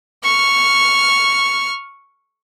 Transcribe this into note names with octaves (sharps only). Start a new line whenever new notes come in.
C#6 F6